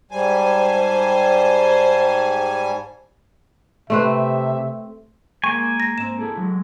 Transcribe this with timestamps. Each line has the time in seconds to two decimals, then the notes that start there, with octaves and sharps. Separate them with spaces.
0.11 G#2 G3 C5 G#5 A5
3.90 C3 A3 C4 B4 E5
5.44 G#3 A#3 G#5 C#6
5.80 A#6
5.98 G#2 C4 E7
6.19 E4 G#4 A4
6.38 F#3 G#3